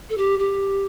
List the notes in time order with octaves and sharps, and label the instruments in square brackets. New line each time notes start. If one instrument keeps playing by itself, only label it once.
[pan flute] A4
G4
G4